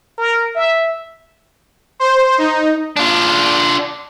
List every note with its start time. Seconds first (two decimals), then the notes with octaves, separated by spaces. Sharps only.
0.18 A#4
0.56 E5
2.00 C5
2.38 D#4
2.97 D4 F4